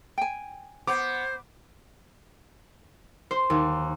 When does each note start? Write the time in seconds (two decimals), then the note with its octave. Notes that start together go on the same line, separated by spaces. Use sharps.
0.18 G5 G#5
0.87 B3 C5 D6
3.31 C5
3.50 D#2